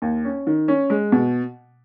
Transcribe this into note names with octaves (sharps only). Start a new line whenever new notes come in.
D#2
C#4
D#3
C#4
G#3
B2